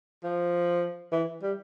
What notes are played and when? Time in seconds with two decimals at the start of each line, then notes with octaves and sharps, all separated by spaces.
0.24 F3
1.12 E3
1.43 G3